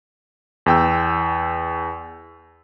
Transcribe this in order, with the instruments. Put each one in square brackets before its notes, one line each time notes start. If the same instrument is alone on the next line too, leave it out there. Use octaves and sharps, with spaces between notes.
[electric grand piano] E2 G5 E6